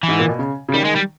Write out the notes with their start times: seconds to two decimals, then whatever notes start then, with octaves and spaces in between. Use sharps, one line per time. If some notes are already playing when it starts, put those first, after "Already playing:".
0.03 E3
0.08 G#2
0.19 A#2
0.29 B2
0.39 C#3
0.69 C#3
0.74 D#3 G3
0.85 G#3
0.96 G3